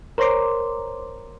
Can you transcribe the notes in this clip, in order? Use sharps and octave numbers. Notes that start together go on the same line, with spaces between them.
A#4 C5 C#5 A#5 C6 D6